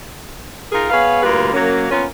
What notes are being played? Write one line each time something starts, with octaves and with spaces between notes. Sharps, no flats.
D#4 F4 G#4 A#4
B3 G#4 B4 C#5 F5
D2 G2 G3 A#3 F4 B4
F#3 A#3 C#4
A#3 B3 C#4 F4 A#4